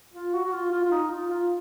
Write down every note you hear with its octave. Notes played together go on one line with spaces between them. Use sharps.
F4
F#4
F#4
F4
F4
F4
D#4
F4
F4